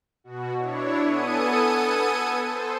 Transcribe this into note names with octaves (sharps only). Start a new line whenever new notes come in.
B2 F#4
D4 E4 C#5
B3 A4 G#5 D#6 C#7 D#7
A4 C5